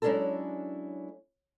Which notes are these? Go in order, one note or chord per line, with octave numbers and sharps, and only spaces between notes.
F#3 G#3 C#4 D4 E4 A4